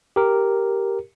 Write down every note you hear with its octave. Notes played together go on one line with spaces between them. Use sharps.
G4 A#4